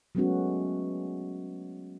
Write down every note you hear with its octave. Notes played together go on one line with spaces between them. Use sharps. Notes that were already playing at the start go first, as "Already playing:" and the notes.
F#3 G#3 A3 B3 C#4 F#4